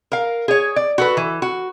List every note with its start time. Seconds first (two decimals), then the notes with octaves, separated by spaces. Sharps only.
0.12 A#4 F5
0.48 G#4 C#5
0.76 D5
0.98 F#4 A4 B4
1.17 E3
1.42 F#4